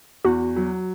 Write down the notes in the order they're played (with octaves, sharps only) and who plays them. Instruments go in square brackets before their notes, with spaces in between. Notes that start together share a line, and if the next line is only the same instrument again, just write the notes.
[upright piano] E2 [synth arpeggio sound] F#4
[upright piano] F#3